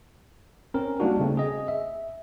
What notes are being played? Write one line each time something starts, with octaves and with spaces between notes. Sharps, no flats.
C4 C#4 A#4
G3 A#3 D4 D#4 F#4
C#3 A3 C4
G#4 D#5
E5